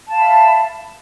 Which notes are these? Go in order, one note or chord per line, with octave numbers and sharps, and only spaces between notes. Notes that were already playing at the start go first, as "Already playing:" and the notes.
E5 F5 A5 B5